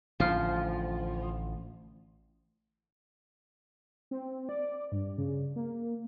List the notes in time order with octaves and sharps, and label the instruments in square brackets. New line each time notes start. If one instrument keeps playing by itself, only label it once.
[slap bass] A1 D3 [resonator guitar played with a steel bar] F3 [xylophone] C5 F5 F6
[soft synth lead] C4
D5
G2
C#3
A#3